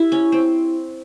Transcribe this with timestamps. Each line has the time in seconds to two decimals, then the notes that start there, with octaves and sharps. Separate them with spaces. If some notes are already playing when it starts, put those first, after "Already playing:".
Already playing: E4 G4
0.12 C#4
0.32 C4